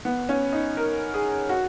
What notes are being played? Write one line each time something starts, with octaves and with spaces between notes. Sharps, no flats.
B3
C#4
D#4
A#4
G#4
F#4